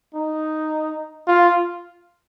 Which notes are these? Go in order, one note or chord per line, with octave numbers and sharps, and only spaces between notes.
D#4
F4